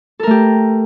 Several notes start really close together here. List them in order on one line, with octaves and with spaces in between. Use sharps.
A4 A#4 A3 G4